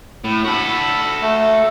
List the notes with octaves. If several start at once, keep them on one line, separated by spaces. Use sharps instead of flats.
A2
F#4 A4 B5
A3